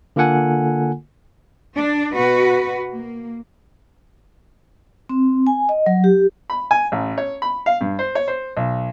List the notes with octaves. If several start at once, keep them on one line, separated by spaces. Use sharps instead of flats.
D3 A#3 F4 A4 F#5 G#5
D4
B2 F#4 B4
A#3
C4
G#5
D#5
F#3
G4
B5
G#5
A1
C#5
B5
F5
G2
C5
C#5
C5
B1